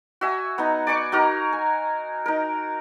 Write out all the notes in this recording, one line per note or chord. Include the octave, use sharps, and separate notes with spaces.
F#4 E5 G#5
B3 D#4
D5 G#5 C#6 D6
D#4 F#4 A#4 A#5
G#5
D#4 A#4